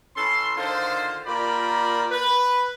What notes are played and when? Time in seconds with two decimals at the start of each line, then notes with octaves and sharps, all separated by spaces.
0.16 E3 C#4 A4 C6
0.57 D3 D#3 F4 A4 C5
1.27 A#2 F4 G4 A#4 D5 B5
2.11 B4